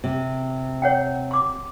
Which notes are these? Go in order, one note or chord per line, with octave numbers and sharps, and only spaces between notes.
C3
C#5 F#5 G5
C6 D6